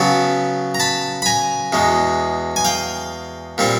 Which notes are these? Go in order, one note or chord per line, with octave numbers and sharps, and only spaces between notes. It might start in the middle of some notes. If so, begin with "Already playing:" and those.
Already playing: C#3 F#3 B3 A5 B5
A#5
A5 B5
B5
G#5 A#5
E2 B2 G#3
G#5
F5 G5
A#2 G3 C4